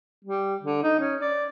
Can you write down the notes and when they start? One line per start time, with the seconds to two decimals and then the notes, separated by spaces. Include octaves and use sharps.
0.25 G3
0.63 D3
0.83 D#4
0.99 C#4
1.21 D5